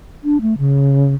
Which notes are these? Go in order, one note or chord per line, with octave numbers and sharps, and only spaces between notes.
D4
A3
C#3